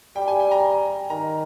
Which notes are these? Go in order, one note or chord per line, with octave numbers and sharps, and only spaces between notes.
G3 G5
G#5
G5
A#5
D#3 A#5